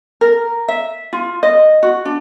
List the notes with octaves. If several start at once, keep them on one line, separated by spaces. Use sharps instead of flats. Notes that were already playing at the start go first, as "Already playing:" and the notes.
A#4
E5
F4
D#5
F#4
D4